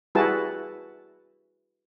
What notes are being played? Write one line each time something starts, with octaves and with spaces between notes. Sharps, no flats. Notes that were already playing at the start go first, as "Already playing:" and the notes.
G3 E4 F#4 G#4 B4 A5